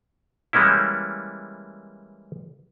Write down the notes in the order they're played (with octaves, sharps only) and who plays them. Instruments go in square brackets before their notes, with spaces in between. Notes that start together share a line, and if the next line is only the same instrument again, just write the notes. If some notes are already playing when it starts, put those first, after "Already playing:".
[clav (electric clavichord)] E3 G3 G#3 A#3 C#4 E4